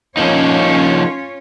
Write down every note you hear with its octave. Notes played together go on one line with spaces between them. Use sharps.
F3 A#3 C#4 D#4 F4 C#5